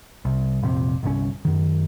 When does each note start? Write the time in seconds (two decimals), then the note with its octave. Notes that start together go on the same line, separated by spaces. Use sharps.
0.25 C2
0.63 F1 A#1 C3
1.03 G1 C2 B2 C#4
1.45 F#2 D#3